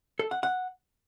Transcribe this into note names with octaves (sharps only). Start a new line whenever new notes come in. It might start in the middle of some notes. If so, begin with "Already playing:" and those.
A4
F#5
F#5